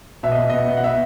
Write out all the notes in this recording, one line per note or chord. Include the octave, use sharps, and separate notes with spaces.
B2 E5
D#5
B2
B3 D#5
B3
F#5
B3 E5